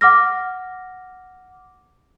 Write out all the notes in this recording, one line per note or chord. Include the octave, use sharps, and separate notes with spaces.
F#5 D6 F6 A#6